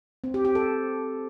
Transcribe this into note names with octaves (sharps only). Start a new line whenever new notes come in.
C4
G4
G4
A4